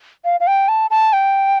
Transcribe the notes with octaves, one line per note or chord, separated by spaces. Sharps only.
F5
F5
G5
A5
A5
G5